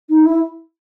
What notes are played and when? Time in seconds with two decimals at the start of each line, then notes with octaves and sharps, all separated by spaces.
0.09 D#4
0.24 E4